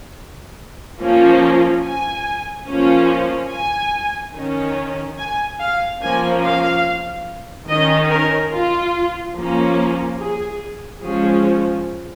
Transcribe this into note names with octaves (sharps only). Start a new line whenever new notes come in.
F3 A#3 C#4
G#5
F3 A#3 C#4
G#5
D#3 C#4
G#5
F5
F3 A#3 C#4 G#5
F5
D#3 C#4 D#5
A#4
F4
F3 A#3 C#4
G#4
F3 G#3 C#4 G#4